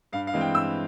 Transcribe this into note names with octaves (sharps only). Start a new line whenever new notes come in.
G2 F5
F5
E3 G#3 C4
G5
G2 E6